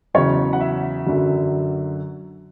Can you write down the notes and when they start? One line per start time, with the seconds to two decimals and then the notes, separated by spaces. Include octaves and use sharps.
0.14 E2 C#3 F#3 C#5
0.53 F#5
0.60 E5
1.07 F#2 D3 F#3